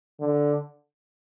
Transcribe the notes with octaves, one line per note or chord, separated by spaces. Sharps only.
D3